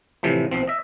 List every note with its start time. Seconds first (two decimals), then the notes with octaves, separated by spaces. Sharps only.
0.23 A2 C3 E3 F3
0.51 B1 F3 C4
0.67 D#5 E5